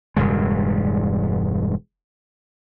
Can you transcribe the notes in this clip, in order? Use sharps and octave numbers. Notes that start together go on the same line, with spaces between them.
E1 G2 C#3 G#3